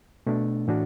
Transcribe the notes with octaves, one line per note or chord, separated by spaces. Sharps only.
B2 A3 D4
A2 E3 D4 F#4